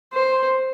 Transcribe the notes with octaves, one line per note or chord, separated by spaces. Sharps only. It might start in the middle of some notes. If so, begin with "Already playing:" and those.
C5